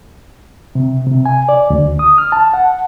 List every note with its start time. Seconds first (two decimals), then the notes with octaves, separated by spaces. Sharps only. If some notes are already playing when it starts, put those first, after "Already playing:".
0.75 C3
1.06 C3
1.26 G#5
1.49 D5
1.70 D2
1.99 D#6
2.18 F6
2.32 A5
2.54 F#5